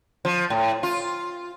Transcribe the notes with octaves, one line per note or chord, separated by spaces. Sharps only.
F3
A2
F4